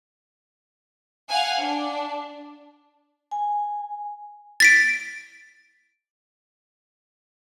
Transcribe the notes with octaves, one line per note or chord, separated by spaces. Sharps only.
F5 F#5 G#5
D4
G#5
A6 B6 D7